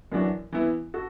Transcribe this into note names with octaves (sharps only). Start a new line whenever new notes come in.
F#2 E3 D4 F#4
E3 B3 E4
F#4 A4